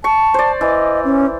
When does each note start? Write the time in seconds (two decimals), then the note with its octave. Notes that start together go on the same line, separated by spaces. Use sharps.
0.04 A5 C#6
0.34 C5 D5
0.61 E3 D#5
1.05 C#4